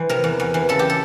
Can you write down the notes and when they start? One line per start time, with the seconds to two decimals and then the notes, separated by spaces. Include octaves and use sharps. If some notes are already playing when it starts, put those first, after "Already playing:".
Already playing: E3 C5
0.09 C3 A#4
0.24 E2
0.40 E2
0.54 E3
0.69 C#3 A4
0.79 G4
0.90 A4